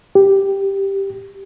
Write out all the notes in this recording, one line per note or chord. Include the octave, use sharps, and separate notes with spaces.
G4